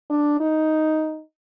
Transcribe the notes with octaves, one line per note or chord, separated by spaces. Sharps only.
D4
D#4